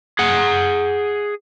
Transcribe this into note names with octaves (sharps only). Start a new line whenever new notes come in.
G#4 F#5